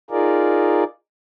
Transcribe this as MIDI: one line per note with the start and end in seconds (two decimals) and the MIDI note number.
0.11 0.84 63
0.11 0.84 65
0.11 0.84 68
0.11 0.84 70
0.11 0.84 74